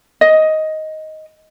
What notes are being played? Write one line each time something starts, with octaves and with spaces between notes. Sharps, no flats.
D#5